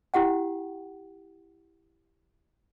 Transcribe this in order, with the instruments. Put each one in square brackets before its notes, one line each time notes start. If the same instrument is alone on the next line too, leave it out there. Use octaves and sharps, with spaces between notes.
[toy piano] E4 G4 F#5 G5